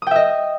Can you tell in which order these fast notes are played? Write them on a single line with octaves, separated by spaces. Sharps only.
D#6 G5 E5 D#5